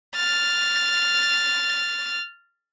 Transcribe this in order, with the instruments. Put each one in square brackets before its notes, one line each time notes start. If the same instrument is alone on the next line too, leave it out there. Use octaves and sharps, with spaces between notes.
[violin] F6 A6